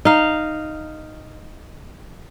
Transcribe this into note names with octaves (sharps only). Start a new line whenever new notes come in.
D#4 F5